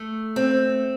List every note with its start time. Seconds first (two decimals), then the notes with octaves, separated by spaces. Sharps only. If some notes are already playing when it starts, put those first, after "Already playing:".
Already playing: A3
0.36 C4